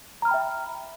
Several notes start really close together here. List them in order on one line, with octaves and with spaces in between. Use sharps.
A#5 F6 B5 G5 E5